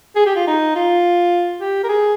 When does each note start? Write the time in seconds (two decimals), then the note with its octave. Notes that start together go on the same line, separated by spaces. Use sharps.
0.16 G#4
0.26 G4
0.36 F4
0.47 D#4
0.75 F4
1.61 G4
1.84 A#4
1.89 G#4